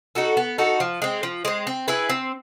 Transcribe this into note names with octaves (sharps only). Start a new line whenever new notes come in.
D#4 F#4 A4
B3
D#4 F#4 A4
F3
G#3 C4
F3
G#3 C4
C4
E4 G#4 B4
C4